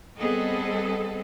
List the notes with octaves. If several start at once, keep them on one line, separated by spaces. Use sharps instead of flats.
G3 B3 C4 G#4 A4 D#5